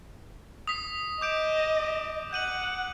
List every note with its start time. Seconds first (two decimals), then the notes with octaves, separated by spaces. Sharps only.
0.67 D#6 B6
1.21 D#5 D6 G6 D7
2.33 F#5 G6 D#7 F#7